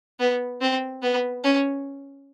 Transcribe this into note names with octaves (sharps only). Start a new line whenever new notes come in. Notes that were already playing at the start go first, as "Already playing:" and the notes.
B3
C4
B3
C#4